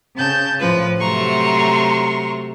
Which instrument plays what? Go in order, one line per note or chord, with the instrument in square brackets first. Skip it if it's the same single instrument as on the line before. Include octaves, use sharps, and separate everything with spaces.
[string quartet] C#3 A5 G6
[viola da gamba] A2 B4 [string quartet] F3
[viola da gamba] C3 F#3 A3 [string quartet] A#5 C6 C#6